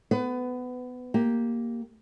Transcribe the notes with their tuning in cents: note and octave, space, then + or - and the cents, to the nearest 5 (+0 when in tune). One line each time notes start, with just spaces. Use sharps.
B3 +15 B4 +25
A#3 +0 G4 +0